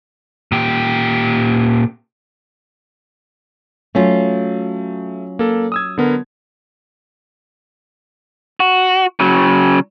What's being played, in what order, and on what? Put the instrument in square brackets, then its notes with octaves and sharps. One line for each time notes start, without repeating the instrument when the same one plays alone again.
[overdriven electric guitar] A#2 G4
[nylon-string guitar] F#3 C#4 F4 [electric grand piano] A3
[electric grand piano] A#3 A4
D#6 E6 G#6
D3 B3 A#4
[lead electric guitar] F#4
C#3 F#3